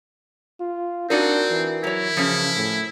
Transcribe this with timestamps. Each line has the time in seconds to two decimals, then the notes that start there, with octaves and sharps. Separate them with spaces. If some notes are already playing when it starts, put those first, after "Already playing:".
0.60 F4
1.10 C4 D4 D#4 F#4 A#4 D5
1.51 E3
1.84 F#3 E4 C#5
2.17 C#3 F3 C#4
2.56 A2